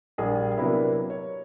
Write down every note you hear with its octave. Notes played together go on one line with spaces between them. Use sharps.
A#1 G3 G#4 A#4
C3 F#3 A#3 B3 D4 E4
C#5